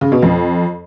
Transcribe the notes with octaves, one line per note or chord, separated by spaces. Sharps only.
C#3
B2
F2